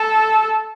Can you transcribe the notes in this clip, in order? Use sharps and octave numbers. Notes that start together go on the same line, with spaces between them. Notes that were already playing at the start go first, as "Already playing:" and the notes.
Already playing: A4